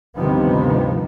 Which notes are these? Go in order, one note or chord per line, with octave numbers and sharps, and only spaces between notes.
D2 G2 C3 D#3 F3 B3